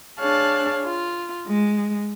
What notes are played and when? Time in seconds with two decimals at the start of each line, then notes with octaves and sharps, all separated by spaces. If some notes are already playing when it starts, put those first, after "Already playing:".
0.20 D4 G#4 C#5 F5 A5 F#6
0.85 F4
1.47 G#3